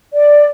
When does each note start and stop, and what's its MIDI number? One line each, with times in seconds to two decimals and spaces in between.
0.13 0.47 74